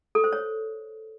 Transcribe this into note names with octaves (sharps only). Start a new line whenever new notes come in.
A4
C5
C#5